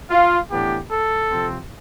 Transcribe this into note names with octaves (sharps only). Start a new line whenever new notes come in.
F4
A2 E3 B3 D4 G4
A4
C3 F3 C4